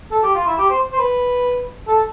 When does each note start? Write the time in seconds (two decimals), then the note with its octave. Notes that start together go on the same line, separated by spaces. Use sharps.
0.12 A4
0.23 G4
0.35 F4
0.47 E4
0.58 G4
0.70 C5
0.92 C5
0.99 B4
1.87 A4